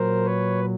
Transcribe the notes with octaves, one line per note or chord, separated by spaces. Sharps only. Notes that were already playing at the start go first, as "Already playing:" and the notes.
Already playing: A#2 F#3 A#4 C5
B4 C#5